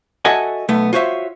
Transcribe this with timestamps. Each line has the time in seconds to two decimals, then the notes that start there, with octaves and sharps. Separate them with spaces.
0.25 F#4 A4 D#5 E5 F#5 G#5
0.69 B1 A3 B3
0.93 F4 F#4 C5 C#5 E5